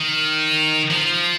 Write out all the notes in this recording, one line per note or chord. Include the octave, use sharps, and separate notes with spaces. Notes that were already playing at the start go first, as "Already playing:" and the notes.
Already playing: D#3
F3